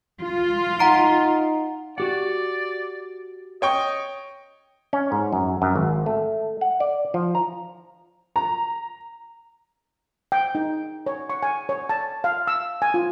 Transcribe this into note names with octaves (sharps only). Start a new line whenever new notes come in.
F4
D#4 F#5 A#5 D7
F#4 G4 D5 F#5
C#5 D#5 G5 C#6
C#4
G#2
F#2
F#2
G#1
A3
F#5
D5
F3
A#5
A#5
G5
D#4
C#5
C#6
G#5
C#5
A5
F5
E6
G#5
F4